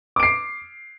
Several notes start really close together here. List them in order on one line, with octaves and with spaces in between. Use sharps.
D6 D7 C7